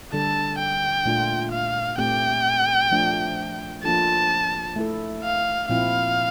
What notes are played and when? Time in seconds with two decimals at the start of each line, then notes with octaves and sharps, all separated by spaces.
0.13 D3 G3 D4 A4 A5
0.59 G5
1.06 A#2 A3 D4 F4
1.52 F5
1.98 A#2 A3 C4 G4 G5
2.91 F3 A3 D4
3.84 F3 A#3 D4 F4 A4 A5
4.76 A3 E4 A4
5.23 F5
5.69 A#2 F3 C4 E4 F5